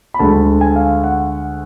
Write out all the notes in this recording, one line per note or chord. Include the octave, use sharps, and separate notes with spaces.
B5
D2 D3 G#3 A5
G#5
F5
F#5